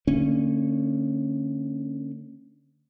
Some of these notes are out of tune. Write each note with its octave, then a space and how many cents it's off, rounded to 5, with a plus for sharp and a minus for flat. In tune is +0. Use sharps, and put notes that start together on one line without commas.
D3 +0 A#3 -45 C#4 -20